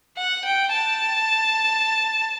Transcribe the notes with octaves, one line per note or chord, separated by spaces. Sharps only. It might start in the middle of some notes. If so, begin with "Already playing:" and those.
F#5
G5
A5